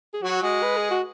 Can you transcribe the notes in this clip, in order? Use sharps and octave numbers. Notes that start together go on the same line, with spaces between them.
G#4
F#3 F#4
G#3 F#4
B4
G#4
F#4